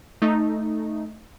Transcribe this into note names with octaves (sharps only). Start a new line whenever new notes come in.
A3 D#4